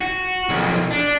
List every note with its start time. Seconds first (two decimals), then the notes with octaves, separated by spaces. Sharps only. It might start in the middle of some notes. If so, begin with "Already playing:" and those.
0.01 F#4
0.49 B1 F2
0.91 D4